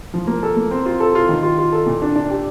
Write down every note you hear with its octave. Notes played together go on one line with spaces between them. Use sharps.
F3
A#3
A4
A#3
C4
F4
A4
F4
D#3
F4
F4
A4
A#2
D4
D4
G4